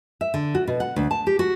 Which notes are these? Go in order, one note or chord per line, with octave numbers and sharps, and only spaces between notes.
E5
D3
F#4
B2
F#5
D2
A5
G4
F#4